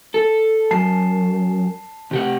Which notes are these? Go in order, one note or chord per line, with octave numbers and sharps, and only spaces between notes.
A4
F#2 A5 C7
C3 G4 F#5